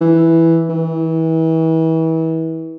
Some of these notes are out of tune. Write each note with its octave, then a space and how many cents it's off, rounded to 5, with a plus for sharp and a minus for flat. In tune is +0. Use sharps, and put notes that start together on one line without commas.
E3 +0
E3 -35